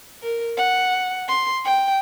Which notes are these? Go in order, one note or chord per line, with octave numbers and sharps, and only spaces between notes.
A#4
F#5
C6
G5